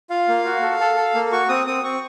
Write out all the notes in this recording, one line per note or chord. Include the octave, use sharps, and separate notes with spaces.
F4 F5
A#3
F#4
A4
A4
A4
A#3
F#4 C#6
C4 D#6
C4 D#6
C4 C#6